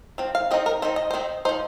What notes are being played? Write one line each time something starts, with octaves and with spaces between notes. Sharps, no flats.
F3 C4
F5
F3 C4 D#4 D#5
A#4
D#3 C4 D#4 C5
D#5
D#3 C4 D#4 C5
F3 D#4 C5